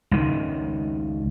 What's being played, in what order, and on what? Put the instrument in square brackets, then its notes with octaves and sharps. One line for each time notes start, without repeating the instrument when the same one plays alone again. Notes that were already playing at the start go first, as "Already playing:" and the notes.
[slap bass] C#2 D#3